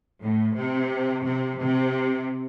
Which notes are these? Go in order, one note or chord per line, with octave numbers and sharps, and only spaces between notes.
A2
C3
C3
C3